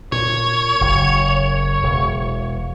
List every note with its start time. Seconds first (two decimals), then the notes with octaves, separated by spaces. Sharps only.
0.12 A#2 C#5
0.81 F#1
1.83 E1